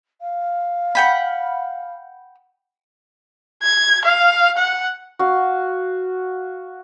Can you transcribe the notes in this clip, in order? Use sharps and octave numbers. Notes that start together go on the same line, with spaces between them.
F5
F#5 G5 B5
G#6
F5
F#5
F#4 F5